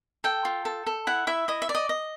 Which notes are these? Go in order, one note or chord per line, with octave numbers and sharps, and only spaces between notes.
A4 G5
F4
A4
A4
E4 F#5
E4 E5
E4 D#5
E5
D5
D#5
D#5